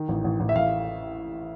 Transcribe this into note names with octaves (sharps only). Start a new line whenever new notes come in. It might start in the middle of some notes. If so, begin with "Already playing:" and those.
Already playing: D#3
A1
A1
A1
E5
A1 F5